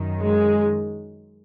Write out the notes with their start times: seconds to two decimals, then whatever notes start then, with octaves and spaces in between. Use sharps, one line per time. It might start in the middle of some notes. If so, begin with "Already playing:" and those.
Already playing: F#2 D#3
0.21 G#3